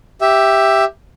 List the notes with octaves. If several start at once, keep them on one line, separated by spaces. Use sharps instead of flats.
G4 E5